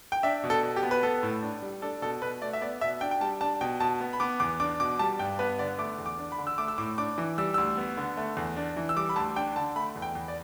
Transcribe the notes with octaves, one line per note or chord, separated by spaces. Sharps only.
G5
D4 E5
B2
A4
B2
G4
B3
B4
B3 A4
A2
D4
G3
D4 A4
B2 A4
B2 B4
A3 D5
E5
B3 D5
B2 E5
D4 G5
G5
G3 A5
D4 A5
B2 G5
B2 A5
B3
B5
B3 D6
E2 D6
D4 D6
B2 D6
G3 A5
G2 G5
B3 B4
D3 D5
A3 D6
E2
D6
D4
B5
D3
E6
A3 D6
E6
A2 D6
D4 D6
E3
G3 E6
D2 E6
B3
D3
A3
E2
D4
E3
E6
G3 D6
B5
D2 A5
D4 G5
D3 A5
A3 B5
E2
G5
E2
D5